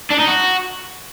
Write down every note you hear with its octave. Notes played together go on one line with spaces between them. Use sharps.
D4
D#4
F#4